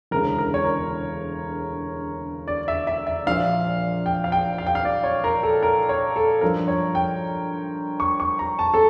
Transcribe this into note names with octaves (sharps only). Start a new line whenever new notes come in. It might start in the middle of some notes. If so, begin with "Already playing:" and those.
E1 D2 C#3 A#4
A#4
C#5
A#4
D5
E5
E5
E5
A#1 A#2 F3 F5
G5
F5
G5
F5
G5
F5
D5
C#5
A#4
A4
A#4
C#5
A4
G2 F3 C#4 A#4
C#5
G5
C#6
C#6
A#5
A5
A4